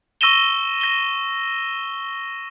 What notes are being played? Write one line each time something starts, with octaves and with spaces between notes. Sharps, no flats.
C#6 E6 A#6 D#7 E7 G7
A#6 G7